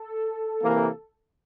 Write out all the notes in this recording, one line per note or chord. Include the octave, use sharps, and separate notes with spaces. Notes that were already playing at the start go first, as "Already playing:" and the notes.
Already playing: A4
C3 E3 A#3